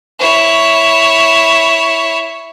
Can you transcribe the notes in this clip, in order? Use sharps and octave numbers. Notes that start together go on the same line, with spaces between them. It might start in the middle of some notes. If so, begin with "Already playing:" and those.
E4 C#5